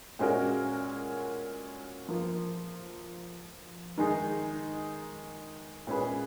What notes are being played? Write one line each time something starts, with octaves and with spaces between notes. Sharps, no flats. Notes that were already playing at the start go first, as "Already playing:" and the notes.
A#2 G#3 C#4 F#4 A#4
F3 A#3 F4
D#3 G#3 D#4 G#4
A#2 G#3 C#4 G#4 B4